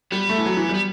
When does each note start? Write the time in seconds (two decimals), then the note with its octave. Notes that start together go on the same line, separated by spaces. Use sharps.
0.12 G3 B3
0.29 A3
0.38 E3
0.46 F#3
0.57 E3
0.69 G3
0.74 B3